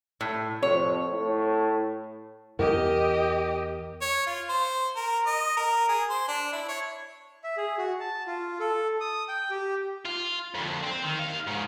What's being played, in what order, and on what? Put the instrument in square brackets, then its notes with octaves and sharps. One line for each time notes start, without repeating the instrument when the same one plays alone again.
[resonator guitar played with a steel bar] A2
[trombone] F2 [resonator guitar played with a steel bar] C#5
[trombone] A2
[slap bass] E2 [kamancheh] G4 D#5 [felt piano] A#4
[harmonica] C#5
F4
C5
A#4
D#5
A#4
G#4
C5
D4
E4
C#5
[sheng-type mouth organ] E5
G#4
F#4
A5
F4
A4
D#6
G5
G4
[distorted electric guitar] F4
F2 D3
C4
D#3
D#2 F5
G#2 C#3